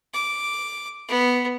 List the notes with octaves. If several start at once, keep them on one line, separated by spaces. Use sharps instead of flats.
D6
B3